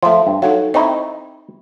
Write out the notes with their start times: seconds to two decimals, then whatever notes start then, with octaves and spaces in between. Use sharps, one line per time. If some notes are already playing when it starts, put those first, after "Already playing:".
0.03 F3 A3 E5 C6
0.27 G2
0.42 F#3 D#4 A4 F5
0.74 C4 D#4 E4 D#5 C#6